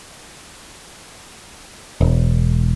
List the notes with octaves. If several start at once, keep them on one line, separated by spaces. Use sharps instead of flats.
E1